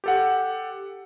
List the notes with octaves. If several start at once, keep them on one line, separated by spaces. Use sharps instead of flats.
G4 A4 F#5